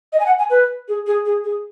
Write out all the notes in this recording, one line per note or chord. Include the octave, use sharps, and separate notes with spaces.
D#5
G#5
F#5
G#5
B4
G#4
G#4
G#4
G#4